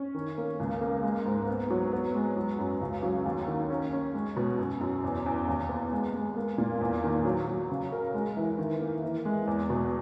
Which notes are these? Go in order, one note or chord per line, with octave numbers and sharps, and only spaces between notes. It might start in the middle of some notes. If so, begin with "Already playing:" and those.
Already playing: C#4
D#3
A#3
C#2
A#3
G#3
G#2
B3
F#3
B3
G#3
F#3
F#2
C#2
F#3
D#2
D#3
C#4
C#4
G#3
B2
F#2
F#2
E2
E2
D#2
B3
G#3
G#3
A#3
A#2
E2
D#3
F#3
F#3
C#3
A#4
G#3
E3
D#3
A#3
E3
G#3
E2
B2